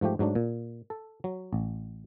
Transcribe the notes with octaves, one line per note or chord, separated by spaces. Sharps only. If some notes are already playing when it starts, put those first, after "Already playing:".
G#2 F3 A3 G4
G#2 F#3 A3 D4
A#2
A4
F#3
A1